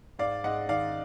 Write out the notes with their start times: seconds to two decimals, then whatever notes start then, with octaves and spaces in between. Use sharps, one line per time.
0.19 G#2 D5 F5
0.44 G#2 D#5 F#5
0.69 D#3 D5 F5